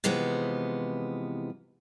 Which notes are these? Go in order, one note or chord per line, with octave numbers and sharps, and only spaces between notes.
C3 E3 F3 G#3 B3